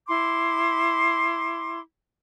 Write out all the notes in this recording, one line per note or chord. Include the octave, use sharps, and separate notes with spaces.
E4 C6 D6